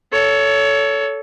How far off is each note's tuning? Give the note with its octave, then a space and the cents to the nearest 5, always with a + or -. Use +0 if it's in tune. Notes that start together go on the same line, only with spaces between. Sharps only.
A4 +0 C#5 +25